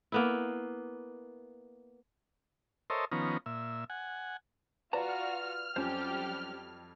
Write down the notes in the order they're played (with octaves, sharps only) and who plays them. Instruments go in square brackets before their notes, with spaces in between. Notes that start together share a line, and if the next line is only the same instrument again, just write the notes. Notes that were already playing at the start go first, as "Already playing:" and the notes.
[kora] A#3 B3 E4
[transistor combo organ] A4 A#4 C5 C#5 D#5 E5
D#3 F3 B3 C#4 A#5
A#2 E5
F#5 G#5
[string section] F4 F#4 [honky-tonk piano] B4 D5 [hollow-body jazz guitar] A5 A#5 [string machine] F6
[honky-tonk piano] F2 [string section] F#3 G3 G4 [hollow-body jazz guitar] C#4 C5